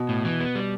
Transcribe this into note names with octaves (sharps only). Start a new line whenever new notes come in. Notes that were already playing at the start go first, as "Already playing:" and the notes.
Already playing: B2
A2
E3
B3
G3